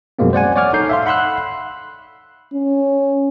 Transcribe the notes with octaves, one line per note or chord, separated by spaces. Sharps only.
F#2 B2 F3 G#3 A#3 C4
C5 D5 F#5 G#5
C#5 D5 F#5 D6 F6 G#6
D#4 A4 G6 C7
E5 F5 C6
F#5 B5 C6 E6 F#6
C#4